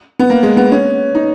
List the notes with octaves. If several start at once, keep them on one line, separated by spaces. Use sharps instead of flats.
B3
A#3
G#3
B3
C#4
D#4